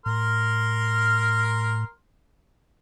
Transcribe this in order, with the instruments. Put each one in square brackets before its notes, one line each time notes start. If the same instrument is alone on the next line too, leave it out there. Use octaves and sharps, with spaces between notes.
[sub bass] A2 [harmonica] A#4 C6 F6